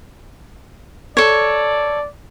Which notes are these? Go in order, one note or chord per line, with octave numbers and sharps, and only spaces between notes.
A4 C#5 D5